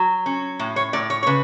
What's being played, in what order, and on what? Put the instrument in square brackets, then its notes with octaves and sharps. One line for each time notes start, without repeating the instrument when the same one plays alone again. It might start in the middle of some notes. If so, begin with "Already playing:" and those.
Already playing: [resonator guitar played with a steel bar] F#3
C#4
A2
C#5
A2 D5
C#5
C#5
C#3 B4